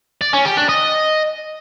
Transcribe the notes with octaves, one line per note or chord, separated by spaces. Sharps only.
D5
C#4
G4
D4
D#5